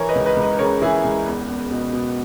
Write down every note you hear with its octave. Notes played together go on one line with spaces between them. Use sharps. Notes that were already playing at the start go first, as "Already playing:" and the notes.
Already playing: E3 A#4 C#5
B4 D#5
C#2
B4 D#5
C#2
B4 D#5
C#3 A#4 C#5
E3 E4 G#4
C#2
E2
E2
B2
B2